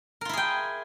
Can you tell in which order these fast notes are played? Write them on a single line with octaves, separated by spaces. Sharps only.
A#4 F4 E4 G#4 G5